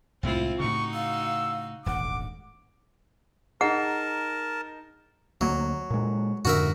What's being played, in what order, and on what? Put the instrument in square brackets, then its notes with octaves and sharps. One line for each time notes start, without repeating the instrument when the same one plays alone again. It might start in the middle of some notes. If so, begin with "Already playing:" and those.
[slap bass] C2 A2 G#3 [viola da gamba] C4 E4 F4
[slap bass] A2 C#3 [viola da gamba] D#4 F#4 [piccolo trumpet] C#6
[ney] F5 [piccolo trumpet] E6
[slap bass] D#1 G#1 D2 [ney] F#5 [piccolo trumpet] D6
[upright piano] D#4 [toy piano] G#4 F#5 [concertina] A#4 A5
[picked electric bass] D2 A#3 [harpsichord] F#3
[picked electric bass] A#2 G#3
[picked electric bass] F2 G#2 D3 [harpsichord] F#4 A#4 E5